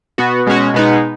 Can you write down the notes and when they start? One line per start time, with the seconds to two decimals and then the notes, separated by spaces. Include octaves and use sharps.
0.18 B2 B3 F#4
0.46 B2 G#3 C#4 F#4
0.74 B2 G#3 B3 D#4